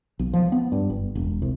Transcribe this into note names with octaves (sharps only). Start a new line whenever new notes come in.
B1
F3
B3
G2
G1
E1
C2